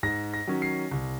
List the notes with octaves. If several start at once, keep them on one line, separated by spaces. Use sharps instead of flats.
G#2 A#6
A#6
D#3 F#3 C#4
C7
C2